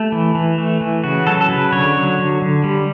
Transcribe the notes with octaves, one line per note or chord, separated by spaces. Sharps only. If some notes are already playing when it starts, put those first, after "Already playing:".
Already playing: A3 G4
E3
E3
A3
E3
C#3 F#4
F#3 A4
A4
C#3 B4
D3 C#5
F#3
D3
D3
G3